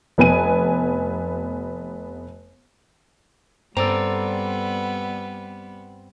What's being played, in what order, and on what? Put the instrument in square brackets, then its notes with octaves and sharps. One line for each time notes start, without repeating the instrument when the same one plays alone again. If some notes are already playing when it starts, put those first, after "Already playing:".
[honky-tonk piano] F1 B3 G#5 D#7
[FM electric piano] G2 [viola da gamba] G3 B3 [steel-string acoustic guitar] C4 [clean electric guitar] A4 D5 A#5